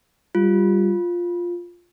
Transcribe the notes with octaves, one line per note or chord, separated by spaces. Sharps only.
G3 F4